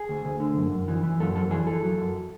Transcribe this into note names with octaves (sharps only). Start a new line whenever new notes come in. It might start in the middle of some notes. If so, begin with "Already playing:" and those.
Already playing: G#4
D2
D2
D3
F#2
F#2
E3
E3
F#2 A4
F#2 A4
E3 G#4
E3 A4
F#3
F#2